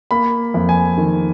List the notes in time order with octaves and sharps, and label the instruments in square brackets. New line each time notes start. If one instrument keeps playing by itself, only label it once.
[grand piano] A#3 B5
F2
G#5
D#3